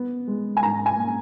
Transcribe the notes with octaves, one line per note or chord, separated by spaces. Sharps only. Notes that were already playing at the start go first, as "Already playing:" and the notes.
Already playing: B3
G#3
G#5
G#2 A#5
G#5
A#3